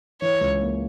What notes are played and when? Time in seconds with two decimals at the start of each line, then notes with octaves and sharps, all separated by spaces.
0.21 E3 C#5
0.41 C#2
0.61 A#3